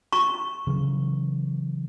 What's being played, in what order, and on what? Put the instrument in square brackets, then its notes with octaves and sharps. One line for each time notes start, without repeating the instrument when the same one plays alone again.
[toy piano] C#6
[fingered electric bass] C#3 E3 F#3